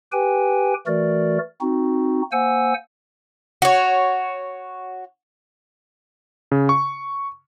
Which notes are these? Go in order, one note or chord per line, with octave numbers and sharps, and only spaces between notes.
G4 B4 G5 G#5
E3 A3 F#4 A#4 D5
C4 D#4 F#4
A#3 C5 F#5 G#5 E6
F#4 C#5
C#3
C#6